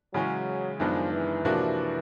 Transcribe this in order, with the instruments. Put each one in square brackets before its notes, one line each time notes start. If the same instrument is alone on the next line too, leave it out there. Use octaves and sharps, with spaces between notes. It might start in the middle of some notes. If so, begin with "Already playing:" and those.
[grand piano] C#3 E3 G#3 C#4 [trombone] F#3
[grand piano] F#2 D#3 G#3 B3 D4 [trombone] F3
[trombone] E3
[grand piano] C3 F3 A#3 D4 F#4